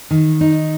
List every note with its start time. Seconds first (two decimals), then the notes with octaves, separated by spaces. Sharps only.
0.11 D#3
0.41 D#4